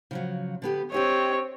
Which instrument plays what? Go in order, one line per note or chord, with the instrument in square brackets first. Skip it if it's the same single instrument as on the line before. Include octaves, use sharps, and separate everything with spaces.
[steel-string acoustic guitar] C#3 F3 F#3
D3 B3 G4
[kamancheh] C4 C#5 [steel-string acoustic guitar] D4 G4 D#5